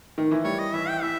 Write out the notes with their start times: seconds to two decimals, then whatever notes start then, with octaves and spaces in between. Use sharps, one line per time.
0.18 D#3
0.31 E3
0.44 G3 C#5
0.59 D#5
0.74 E3 E5
0.88 G5
1.02 E3 E5